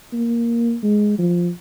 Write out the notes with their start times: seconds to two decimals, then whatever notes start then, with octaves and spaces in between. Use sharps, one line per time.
0.13 A#3
0.83 G#3
1.19 F3